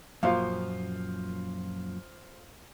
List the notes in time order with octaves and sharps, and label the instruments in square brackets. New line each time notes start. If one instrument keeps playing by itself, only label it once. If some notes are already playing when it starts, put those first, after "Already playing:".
[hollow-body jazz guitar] F#2 A#2 F3 [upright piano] F4 C5 F5